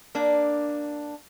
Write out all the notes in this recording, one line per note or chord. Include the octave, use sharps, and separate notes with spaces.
A#3 D4